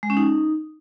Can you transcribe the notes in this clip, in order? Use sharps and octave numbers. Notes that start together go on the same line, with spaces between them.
G#3
C#4
D#4